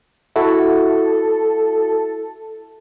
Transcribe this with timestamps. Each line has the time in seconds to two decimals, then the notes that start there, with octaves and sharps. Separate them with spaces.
0.36 E4 F#4 A4